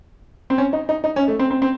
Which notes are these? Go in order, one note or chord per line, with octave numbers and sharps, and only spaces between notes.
C4
C#4
D#4
D#4
D#4
C#4
A3
C4
C4
C4